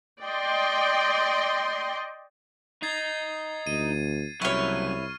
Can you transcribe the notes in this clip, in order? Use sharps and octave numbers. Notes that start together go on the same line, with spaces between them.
D5 D#5 G5 C6
D#4 G#6 A6 C7
D2 D#7
C2 C#3 F#3 E4 C#5 C#6 F6